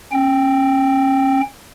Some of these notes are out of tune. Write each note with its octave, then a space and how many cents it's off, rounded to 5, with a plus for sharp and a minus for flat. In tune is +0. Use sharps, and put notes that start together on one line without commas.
C#4 -30 G5 +0